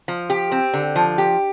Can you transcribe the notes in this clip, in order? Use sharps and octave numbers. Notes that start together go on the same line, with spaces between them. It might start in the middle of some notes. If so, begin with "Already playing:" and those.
F3
G4
C4
D3
F3
G4